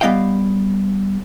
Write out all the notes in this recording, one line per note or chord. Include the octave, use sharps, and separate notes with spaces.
G3 B3 D#5 F5 G5